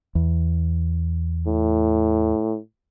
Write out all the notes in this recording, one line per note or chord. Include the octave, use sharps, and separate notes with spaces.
E2
A2